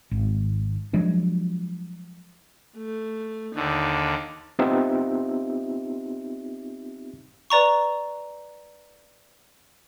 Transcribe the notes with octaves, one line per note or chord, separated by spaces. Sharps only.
G#1
F3 F#3 G#3 D4
A3
D#2 D3 D#4
B3 C4 D#4 F4 G4 E5
B4 D5 A#5 C#6